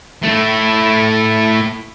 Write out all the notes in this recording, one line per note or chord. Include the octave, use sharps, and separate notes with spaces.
A3 E4